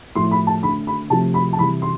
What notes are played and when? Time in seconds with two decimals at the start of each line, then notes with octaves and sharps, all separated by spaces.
0.15 A2 F3 A3 C6
0.31 B5
0.47 A5
0.63 D3 B5
0.66 A3
0.87 B5
1.10 C3 F3 A3 A5
1.34 B5
1.53 A5
1.59 C3 E3 G3 B5
1.82 C6